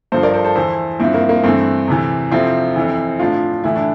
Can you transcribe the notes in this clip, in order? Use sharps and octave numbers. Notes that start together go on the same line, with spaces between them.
G2 F3 A4 C5
A#4 D5
A4 C5
A4 C5
E2 E3 A4 C5
G2 F3 C4 E4
A#3
A#3
G2 E3 A3 C4
E2 C3 E3
F2 C3 F3 C4 E4
F2 E3
A2 F3 D4 F4
A2 E3 E4
D4